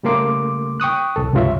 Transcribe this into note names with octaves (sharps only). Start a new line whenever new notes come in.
C#3 G3 A3 A#3 C6 D6
G5 C#6 D#6 F#6
C2 A4
C#2 G2 C3 F4 C#5 E5